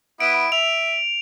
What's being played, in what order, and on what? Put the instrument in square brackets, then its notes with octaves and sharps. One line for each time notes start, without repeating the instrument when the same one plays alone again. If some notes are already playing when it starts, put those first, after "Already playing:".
[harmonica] B3 E4 [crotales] D7
[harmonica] E5 [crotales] F7